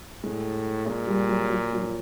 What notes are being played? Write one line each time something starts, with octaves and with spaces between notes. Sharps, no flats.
A2 G#3
A#2 G#3
G3
F#3
F#3
F#3
F3